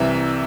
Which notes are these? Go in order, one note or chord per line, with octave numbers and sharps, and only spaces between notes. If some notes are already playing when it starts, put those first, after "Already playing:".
Already playing: C2 C3 E3 E5